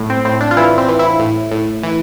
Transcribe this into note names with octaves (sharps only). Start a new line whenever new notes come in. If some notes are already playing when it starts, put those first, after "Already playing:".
Already playing: A2
C4
A2 C4
D4
F4
E3 E4
C4
E3
E4
A2
A2
E3